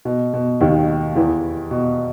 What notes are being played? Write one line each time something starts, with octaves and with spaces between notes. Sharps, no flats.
B2
B2
D#2 D#3
E2 E3
B2